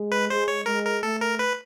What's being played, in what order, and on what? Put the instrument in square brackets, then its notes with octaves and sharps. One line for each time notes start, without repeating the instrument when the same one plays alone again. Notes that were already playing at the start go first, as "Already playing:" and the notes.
Already playing: [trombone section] G#3
[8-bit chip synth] B4
[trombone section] G#3 [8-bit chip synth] C5
[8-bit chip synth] C#5
[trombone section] G#3 [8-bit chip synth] A#4
[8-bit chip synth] A#4
[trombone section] A3 [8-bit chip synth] A4
[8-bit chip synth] A#4
B4